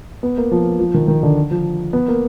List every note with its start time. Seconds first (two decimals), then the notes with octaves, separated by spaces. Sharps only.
0.23 B3
0.38 A#3
0.51 F3
0.79 F3
0.94 D#3
1.08 D#3
1.23 D3
1.51 F3
1.93 B3
2.08 A#3